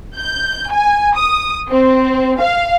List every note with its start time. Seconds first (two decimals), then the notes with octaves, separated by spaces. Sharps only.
0.17 G6
0.71 G#5
1.14 D#6
1.70 C4
2.41 F5